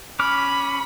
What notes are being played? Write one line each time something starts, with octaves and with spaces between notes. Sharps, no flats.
C#4 B5 D6 F6